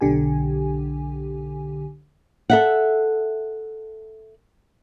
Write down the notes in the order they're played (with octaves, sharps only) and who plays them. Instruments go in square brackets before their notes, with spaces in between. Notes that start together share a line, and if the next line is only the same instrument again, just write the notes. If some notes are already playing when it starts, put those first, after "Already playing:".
[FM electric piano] B1 D3 G4 G#5
[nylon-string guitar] A4 E5 F#5